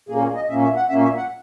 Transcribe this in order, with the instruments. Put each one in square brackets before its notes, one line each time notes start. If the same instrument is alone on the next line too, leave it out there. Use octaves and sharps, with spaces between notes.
[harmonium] A#2 A#3 C#4 G#4
G#4
D#5
A#2 A#3 C#4 E5
E5
F#5
A#2 A#3 C#4 E5
E5
F#5